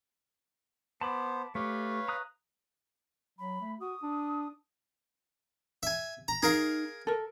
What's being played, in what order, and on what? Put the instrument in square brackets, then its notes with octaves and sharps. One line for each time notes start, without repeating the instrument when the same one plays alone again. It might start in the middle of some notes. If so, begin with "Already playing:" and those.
[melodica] B3 C5 [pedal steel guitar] A5 B5 D6
[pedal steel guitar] A3 G4 [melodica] B4 C#5 F5
[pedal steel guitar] A#5 D#6 F#6
[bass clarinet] F#3 [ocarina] B5
[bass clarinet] A3
[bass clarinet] F#4 [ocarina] D#6
[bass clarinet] D4
[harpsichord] E5 G#5
A#5
[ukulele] D#4 [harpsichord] G#4 A#4 F5
[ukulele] A4 A#4